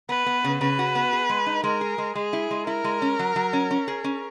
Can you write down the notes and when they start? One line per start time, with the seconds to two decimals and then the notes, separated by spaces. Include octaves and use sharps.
0.09 B3 B4
0.26 B3
0.44 C#3
0.61 C#3 B4
0.79 F#4
0.95 B3
1.13 G#4
1.29 G#3
1.46 D#4
1.64 G#3 A#4
1.81 G#4
1.98 G#3
2.15 G#3 G#4
2.33 E4
2.51 G#3
2.67 E4 A#4
2.84 G#3
3.02 C#4
3.19 F#3
3.36 F#3
3.53 C#4
3.71 C#4
3.88 G#4
4.04 C#4